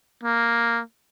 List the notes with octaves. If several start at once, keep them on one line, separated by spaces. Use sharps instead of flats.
A#3